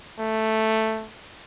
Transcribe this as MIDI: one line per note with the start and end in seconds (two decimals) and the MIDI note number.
0.19 1.07 57